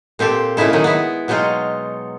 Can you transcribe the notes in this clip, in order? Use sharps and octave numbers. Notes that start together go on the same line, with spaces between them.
A#2 C4 G4 A4
A#2 C#3 D#4 E4 A4
D#3 F#3 G#3 D#4
B3 E4
B2 F#3 G#3 D#4 F4